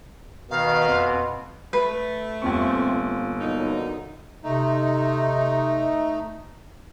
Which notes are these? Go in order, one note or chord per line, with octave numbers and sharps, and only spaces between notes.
B2 D#3 F5
F2
A3 B4
G1 A#2 C4 C#6
B1 F#2 D3 D#4
C3 A3 D#4